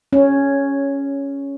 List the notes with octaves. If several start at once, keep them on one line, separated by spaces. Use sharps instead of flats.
C#4